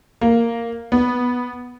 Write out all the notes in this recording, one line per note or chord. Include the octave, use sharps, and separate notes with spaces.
A#3
B3